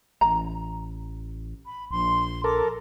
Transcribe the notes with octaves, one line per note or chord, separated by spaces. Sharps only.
A1 A#5
B5
A#1 C6
A4 A#4 D6